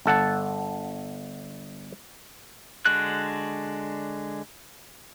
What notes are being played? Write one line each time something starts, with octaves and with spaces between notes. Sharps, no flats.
G1 A4 F#5 A5
D3 G#3 D4 F#4 F#6